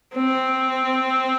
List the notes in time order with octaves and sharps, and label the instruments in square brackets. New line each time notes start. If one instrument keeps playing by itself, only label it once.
[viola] C4